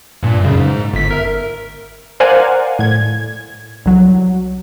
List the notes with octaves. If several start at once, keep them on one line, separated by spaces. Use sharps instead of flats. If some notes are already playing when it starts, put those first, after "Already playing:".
G2 A#2
F#2 C#3
G#2
G1 B6
A#4 E5
A#4 C5 D5 F5 F#5 G#5
A2 G#6
C2 F#3